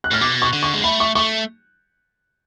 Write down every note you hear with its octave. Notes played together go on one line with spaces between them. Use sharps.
F#6
A2 F6
B2 D6
C#6
D3
C#6
G#3
A3 B5
C#6
A3 C#6